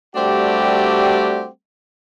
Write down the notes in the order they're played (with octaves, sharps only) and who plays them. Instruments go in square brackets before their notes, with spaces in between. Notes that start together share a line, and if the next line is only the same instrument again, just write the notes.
[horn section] G3 A3 C4 D4 F#4 G4